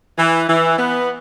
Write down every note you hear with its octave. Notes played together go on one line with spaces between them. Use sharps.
E3
E3
B3